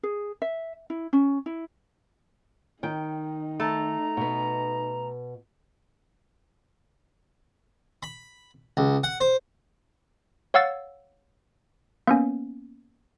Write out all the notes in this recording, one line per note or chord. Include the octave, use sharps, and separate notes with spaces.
G#4
E5
E4
C#4
E4
D#3 D#4 G5
A3 A5 A#5
B2 B3
B5
C#2
F#5
C5
C#5 F5 F#5 E6 A6
A#3 B3 C#4